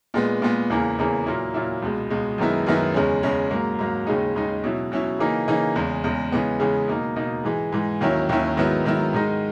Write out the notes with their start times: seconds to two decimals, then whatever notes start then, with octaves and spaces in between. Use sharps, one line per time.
0.14 A#2 G#3 B3
0.42 A#2 G#3 B3
0.70 E2 C#3 E3 A#3
0.98 E2 C#3 E3 A#3
1.26 A#2 F#3 A#3 E4
1.54 A#2 F#3 A#3 E4
1.82 C#2 B2 G#3
2.10 C#2 B2 G#3
2.38 F#2 D#3 G#3 B3 E4
2.67 F#2 D#3 G#3 B3 E4
2.94 E2 C#3 G#3 C#4
3.23 E2 C#3 G#3 C#4
3.51 G#2 F#3 A#3
3.79 G#2 F#3 A#3
4.07 D#2 C#3 G#3 D#4
4.35 D#2 C#3 G#3 D#4
4.64 B2 F#3 C#4 E4
4.92 B2 F#3 C#4 E4
5.19 C#3 E3 A#3 D#4
5.48 C#3 E3 A#3 D#4
5.76 E2 C#3 G#3
6.04 E2 C#3 G#3
6.32 C#3 E3 G#3 B3
6.60 C#3 E3 G#3 B3
6.88 B2 A#3 D#4
7.16 B2 A#3 D#4
7.44 G#2 E3 G#3
7.72 G#2 E3 G#3
8.01 D#2 D#3 F#3 C#4 E4
8.29 D#2 D#3 F#3 C#4 E4
8.57 G#2 D#3 F#3 B3 E4
8.84 G#2 D#3 F#3 B3 E4
9.13 G#2 D#3 G#3 D#4